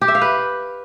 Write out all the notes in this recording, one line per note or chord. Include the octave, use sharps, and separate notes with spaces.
G4
E5
F5
B4